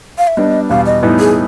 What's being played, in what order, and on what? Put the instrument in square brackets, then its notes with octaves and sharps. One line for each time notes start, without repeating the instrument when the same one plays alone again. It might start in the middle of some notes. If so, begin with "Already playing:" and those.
[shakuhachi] F5
E5
[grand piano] G3 B3 D4 [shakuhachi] D#5
[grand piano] E2 B2 G3 [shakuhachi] F5
[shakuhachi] D#5
[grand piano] A2 E3 G3 B3 D#4
[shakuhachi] G#4